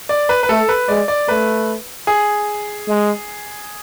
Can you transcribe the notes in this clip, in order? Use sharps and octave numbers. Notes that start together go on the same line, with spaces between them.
D5
B4
B4
A3 A4
B4
G#3 D5
D5
A3 B4
G#4
G#3